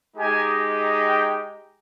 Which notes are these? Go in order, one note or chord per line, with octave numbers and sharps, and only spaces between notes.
G#3 D#4 G4 G#5
G5